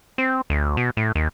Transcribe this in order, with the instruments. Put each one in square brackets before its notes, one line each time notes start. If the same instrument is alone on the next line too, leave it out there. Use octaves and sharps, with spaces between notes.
[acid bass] C4
D2
B2
A2
D#2